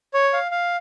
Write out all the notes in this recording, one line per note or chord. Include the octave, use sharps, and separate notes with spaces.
C#5
F5
F5